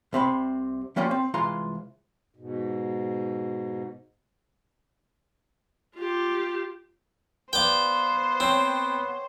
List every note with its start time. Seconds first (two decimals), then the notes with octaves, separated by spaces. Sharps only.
0.13 C2 C3 C4 B5
0.96 F3 G3 A#3 C#4 F4
1.11 C4
1.34 C2 E3 G#3 F4 A#5 C6
2.36 G#2 B2
5.95 F4 G4
7.53 B3 B4 C5 D5 F5 G5 D6
8.40 C4 C#5 G5